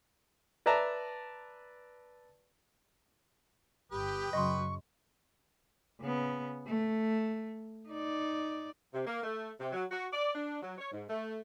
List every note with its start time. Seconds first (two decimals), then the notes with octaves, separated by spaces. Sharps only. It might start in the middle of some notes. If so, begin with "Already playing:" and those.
0.66 B4 D5 E5 A5 A#5
3.91 G1 G4 B4 G5 D#6
4.33 F#2 C#3 F#3 D#5 C6 C#6
6.01 C#3 B3
6.67 A3
7.89 D#4 D5
8.93 C3
9.07 A#3
9.24 A3
9.60 C3
9.73 F#3
9.91 F#4
10.13 D5
10.35 D4
10.62 F#3
10.78 C#5
10.92 G#2
11.09 A3